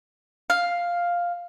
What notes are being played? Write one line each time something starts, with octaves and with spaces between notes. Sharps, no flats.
F5